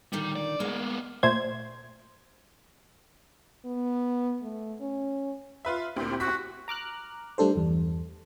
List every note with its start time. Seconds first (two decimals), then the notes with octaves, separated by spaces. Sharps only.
0.13 A#2 D3 D#3 G3
0.36 D5
0.60 G#3 A#3 B3
1.23 A#2 A3 C5 G#6
3.65 B3
4.43 A3
4.81 C#4
5.65 F4 B4 E5
5.96 D2 A#2 C4 E4 G4
6.20 F#4 B6
6.68 A#5 D6 F6 F#6
7.38 G3 A3 D4 A4 C5
7.56 E2 G2